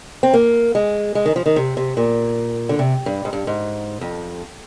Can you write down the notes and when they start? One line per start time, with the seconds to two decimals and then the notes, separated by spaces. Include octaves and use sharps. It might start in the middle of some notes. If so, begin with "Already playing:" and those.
0.23 C4
0.34 A#3
0.75 G#3
1.15 G#3
1.25 D#3
1.36 F3
1.46 D#3
1.56 C3
1.77 C3
1.97 A#2
2.69 D3
2.79 C3
3.06 G2
3.25 G#2
3.33 G2
3.47 G#2
4.01 F2